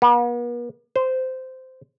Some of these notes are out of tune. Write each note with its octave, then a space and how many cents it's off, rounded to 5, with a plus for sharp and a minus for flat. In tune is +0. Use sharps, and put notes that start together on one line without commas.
B3 -45
C5 -15